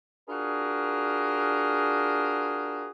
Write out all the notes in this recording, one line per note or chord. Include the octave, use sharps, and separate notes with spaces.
D4 F4 F#4 G#4 A#4